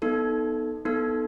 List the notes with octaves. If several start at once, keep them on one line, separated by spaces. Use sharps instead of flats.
B3 D#4 A4
B3 D#4 A4